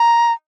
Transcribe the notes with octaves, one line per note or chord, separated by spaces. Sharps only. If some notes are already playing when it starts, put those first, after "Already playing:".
Already playing: A#5